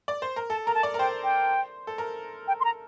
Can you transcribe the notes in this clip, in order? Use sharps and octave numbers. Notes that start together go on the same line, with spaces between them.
D5
C5
A#4
A4 A5
A#4 A#5
A5
D5
A#4
C5 G5
G5
A4
A#4
G5
C6
A#5